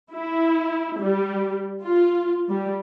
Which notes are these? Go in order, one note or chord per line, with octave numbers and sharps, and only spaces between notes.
E4
G3
F4
G3